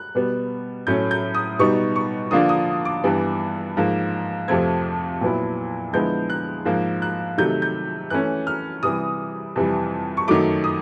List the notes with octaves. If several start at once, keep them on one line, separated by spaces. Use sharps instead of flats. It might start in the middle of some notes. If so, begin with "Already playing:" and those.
Already playing: F#6
B2 G3 B3
A2 F#3 A3 C#4 G6
G6
D#6
B2 G3 B3 D#4 C#6
C#6
D3 F3 A#3 D4 F4 D#6
D#6
D6
G2 E3 G3 B3
G#2 F3 A#3
F2 C3 F3 A3 C4 G#6
A#2 F#3 B3 E4
D3 F3 G#3 B3 E4 G6
F#6
G#2 F3 A#3
F#6
C3 D#3 F#3 A3 G6
G6
E3 A3 C#4 F#6
F6
C3 E3 G3 D#6
F2 C3 E3 G3
C#6
F#2 D#3 F#3 A3 D6
D#6